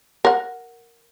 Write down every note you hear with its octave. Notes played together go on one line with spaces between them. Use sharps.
A#4 F#5